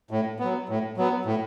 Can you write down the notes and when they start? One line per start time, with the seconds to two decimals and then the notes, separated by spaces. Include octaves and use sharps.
0.11 A2
0.39 F#3 B3
0.69 A2
0.97 F#3 B3
1.25 A2